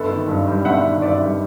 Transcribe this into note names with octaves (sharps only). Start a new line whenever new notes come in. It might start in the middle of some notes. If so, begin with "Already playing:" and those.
Already playing: G1 A4 B4
D#3
G2
G3
G1 E5 F#5
D#3
G2 D5 E5
G3